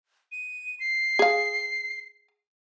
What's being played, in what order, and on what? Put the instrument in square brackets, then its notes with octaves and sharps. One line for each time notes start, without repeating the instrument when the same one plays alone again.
[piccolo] D#7
C7
[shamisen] G#4 F5